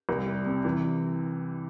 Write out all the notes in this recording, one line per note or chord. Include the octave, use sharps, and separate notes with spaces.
C2
G3
C3
E3